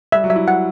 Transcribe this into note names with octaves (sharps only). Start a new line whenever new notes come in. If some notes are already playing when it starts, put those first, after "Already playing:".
G3 E5
F#3
E5
E4
F#5